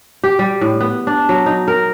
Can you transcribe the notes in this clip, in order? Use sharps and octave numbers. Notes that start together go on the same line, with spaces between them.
G4
G3
A2
B3
D4
F#3
D#4
A#4